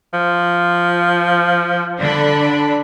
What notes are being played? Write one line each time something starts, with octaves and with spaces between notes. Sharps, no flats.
F3
D3 D4 B5